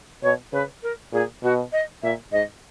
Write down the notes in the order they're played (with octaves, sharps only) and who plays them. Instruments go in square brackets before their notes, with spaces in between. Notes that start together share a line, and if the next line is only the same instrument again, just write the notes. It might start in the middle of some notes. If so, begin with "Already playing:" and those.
[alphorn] B2 [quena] C#5
[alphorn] C#3 [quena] B4
[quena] A#4
[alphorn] A#2 [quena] G#4
[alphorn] B2 [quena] F#4
[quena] D#5
[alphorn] A#2 [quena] E5
[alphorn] G#2 [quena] D#5